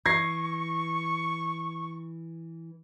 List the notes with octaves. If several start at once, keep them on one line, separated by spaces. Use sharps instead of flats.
E3 C#6 G#6 A#6 C7